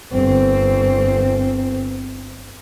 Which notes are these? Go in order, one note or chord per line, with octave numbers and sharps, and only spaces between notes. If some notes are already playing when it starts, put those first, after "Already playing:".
G1 C4